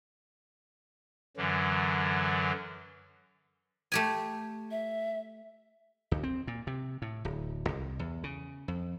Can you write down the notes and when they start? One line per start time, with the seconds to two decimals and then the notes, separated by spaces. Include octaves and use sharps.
1.37 F#2 D3 E3 F#3
3.92 A3 G4 G#5
4.71 E5
6.11 D2
6.23 C4
6.47 A#2
6.67 C3
7.02 A2
7.25 D1
7.68 C2
7.99 E2
8.24 C#3
8.68 F2